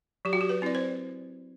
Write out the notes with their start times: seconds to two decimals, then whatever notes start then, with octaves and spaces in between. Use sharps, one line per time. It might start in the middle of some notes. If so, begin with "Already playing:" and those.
0.25 F#3 G4
0.33 F#4
0.41 G4
0.49 B4
0.62 C4 E4 D5
0.75 C5